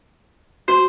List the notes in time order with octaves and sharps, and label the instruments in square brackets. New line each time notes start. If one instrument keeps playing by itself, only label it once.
[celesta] F#4 C6 [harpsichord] C5